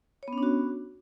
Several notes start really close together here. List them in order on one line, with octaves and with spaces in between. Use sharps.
C#5 B3 C#4 D4 F#4